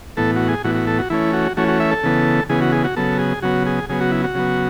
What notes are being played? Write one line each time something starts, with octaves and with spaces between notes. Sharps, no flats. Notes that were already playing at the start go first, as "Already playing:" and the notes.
A2 E3 B3 A4
F#4
G#4
A2 E3 B3 F#4
F#4
A4
F#4
E3 A3 C#4 E4
F#4
E3 A3 C#4 F#4
F#4
E5
A4
C#3 E3 B3
C#3 E3 B3 G#4
F#4
G#4
F#4
C#3 F#3 B3 A4
G#4
C#3 F#3 B3 F#4
G#4
C#3 F#3 B3 G#4
F#4
E4
F#4
C#3 F#3 B3